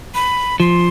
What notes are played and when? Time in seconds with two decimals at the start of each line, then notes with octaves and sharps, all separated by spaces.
0.15 B5
0.60 F3 C6